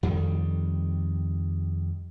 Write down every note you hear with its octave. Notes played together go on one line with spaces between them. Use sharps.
F2 D#3 G3